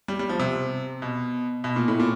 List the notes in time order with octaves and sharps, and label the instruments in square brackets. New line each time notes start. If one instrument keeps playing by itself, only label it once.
[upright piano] G3
G3
F3
C3
B2
B2
A#2
A2
A#2